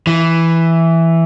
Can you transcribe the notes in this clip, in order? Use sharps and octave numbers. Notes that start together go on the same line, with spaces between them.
E3